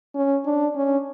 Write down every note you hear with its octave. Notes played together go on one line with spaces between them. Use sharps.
C#4
D4
C#4